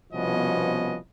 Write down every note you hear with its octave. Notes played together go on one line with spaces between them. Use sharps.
C2 B2 F3 B3 C#4 D#5